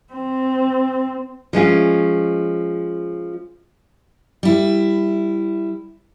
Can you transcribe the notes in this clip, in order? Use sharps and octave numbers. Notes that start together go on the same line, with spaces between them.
C4
F3 G#3 C#4 F4
G3 E4